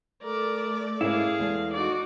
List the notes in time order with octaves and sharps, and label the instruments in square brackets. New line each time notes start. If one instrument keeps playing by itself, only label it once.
[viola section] A3 D5 [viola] A#4
[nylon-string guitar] G#2 C#4 A#4 [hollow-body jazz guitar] E4 [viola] G#4 F5
[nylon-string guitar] E2 G#3 A4
[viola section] D#4 F#4 [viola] D5